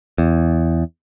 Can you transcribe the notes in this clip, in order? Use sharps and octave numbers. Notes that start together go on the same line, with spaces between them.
E2